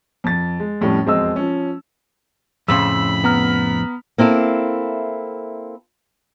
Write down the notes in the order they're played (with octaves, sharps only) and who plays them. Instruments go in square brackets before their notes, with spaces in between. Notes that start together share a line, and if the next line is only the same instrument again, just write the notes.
[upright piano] F2 A6
G#3
F2 A2 G3 C#4
E1 F2 G#3 C4 D#5 E6
F3 C#4
[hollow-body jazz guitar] F2 A2 C#3 [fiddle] B5 [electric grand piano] C6 E6
[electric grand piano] B3 A#5 F6
[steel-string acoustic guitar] A#3 C4 E4 A4